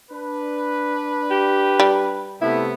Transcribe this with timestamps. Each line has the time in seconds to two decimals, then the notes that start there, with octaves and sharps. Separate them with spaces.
0.11 D4 B4
1.31 G4
1.80 G3
2.42 C3 A3 B3 E4